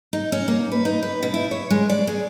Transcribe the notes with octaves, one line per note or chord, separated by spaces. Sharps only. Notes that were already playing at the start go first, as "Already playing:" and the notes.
D#4
C#4
A#3
B4
D#4
B4
B2
E4
C#5
G#3
D5
G#4